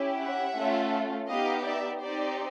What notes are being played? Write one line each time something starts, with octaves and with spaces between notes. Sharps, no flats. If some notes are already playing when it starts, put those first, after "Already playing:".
Already playing: C#4 E4 G4
E5 F#5
A3 C#4 F4 A4
B3 D#4 G4 D#5 F5
D5 E5
C4 D#4 G4 C5 D5